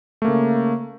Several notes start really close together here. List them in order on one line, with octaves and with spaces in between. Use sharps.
A3 A#3 C#3